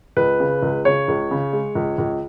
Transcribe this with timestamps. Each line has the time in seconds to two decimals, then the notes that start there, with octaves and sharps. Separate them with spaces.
0.17 C#2 B4
0.40 C#3
0.63 C#2
0.85 C#3 C#5
1.08 C#2
1.31 C#3
1.53 G#3
1.75 C#2
1.98 C#2